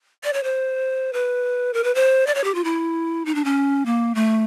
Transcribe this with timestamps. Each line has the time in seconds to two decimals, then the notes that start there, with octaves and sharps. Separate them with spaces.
0.24 D5
0.33 C#5
0.43 C5
1.13 B4
1.74 A#4
1.84 B4
1.95 C5
2.27 D5
2.35 C#5
2.44 G4
2.55 F4
2.64 E4
3.26 D#4
3.35 D4
3.45 C#4
3.86 A#3
4.15 A3